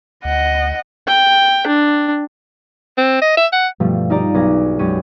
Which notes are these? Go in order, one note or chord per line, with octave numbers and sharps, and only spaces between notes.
D2 D#5 F#5
G5
D4
C4
D#5
E5
F#5
G2 B2 F3 G3 A3
D#4 F4 G4 D5 D#5 A#5
B1 B3 G#4 D6 A#6
F#2 G#3 C#4 G4 C#5 D#7